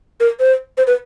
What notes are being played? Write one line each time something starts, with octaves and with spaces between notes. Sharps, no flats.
A#4
C5
C5
B4